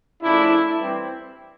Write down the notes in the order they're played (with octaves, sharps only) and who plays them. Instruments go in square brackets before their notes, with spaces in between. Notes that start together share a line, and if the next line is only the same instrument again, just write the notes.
[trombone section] C#3 F3 A3 D4 E4
E3 G3 C4